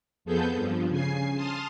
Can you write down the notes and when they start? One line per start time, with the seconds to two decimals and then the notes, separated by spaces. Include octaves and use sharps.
0.25 F2 F3 B3 G#4 A4 G6
0.56 G2 F3
0.89 C#3 G#5 C7
1.35 A5 C6 D#6 F6